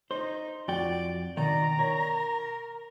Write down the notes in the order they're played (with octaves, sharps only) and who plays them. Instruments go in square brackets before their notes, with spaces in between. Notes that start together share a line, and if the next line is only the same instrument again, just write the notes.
[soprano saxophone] D#4 [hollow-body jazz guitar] C5
[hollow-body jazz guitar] F2 F#4 G5 [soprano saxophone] D5
[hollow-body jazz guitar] B2 D#3 D#4 [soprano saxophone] D5 [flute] A#5
[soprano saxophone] A#4 [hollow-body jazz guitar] C#5